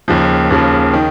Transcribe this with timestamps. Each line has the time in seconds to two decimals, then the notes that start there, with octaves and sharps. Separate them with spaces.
0.08 D#2 C#3 F3
0.50 D#2 C#3 F3
0.94 D#3